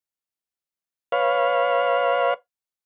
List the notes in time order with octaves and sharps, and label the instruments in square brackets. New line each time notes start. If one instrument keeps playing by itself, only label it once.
[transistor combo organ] B4 C#5 F5